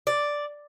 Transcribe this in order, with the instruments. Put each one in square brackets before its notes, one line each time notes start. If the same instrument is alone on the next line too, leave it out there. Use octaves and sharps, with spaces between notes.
[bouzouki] D5